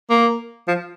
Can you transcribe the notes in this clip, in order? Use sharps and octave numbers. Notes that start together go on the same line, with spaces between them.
A#3
F3